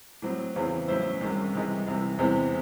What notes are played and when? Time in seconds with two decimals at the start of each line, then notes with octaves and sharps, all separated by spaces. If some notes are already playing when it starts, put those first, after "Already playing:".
0.22 A2 F#3 C4
0.56 E2 C#3 E3 C4
0.88 A2 F#3 C#4 E4 C5
1.21 C2 C3 D#3 G#3 C#4
1.53 C2 C3 E3 G#3 D#4
1.87 C2 C3 E3
2.18 E2 C3 E3 G#3 C4